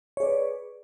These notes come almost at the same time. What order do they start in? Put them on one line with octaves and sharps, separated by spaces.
C#5 G#4 D5 B4